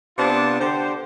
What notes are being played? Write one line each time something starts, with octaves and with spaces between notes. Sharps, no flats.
C3 B3 D4 F4 A5
D3 G4 C5